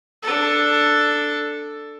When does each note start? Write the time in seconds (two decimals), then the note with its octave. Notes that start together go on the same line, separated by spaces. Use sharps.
0.23 D4 A4